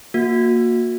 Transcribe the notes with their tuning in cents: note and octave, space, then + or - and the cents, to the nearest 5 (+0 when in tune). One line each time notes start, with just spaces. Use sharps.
A#3 +0 F#4 -35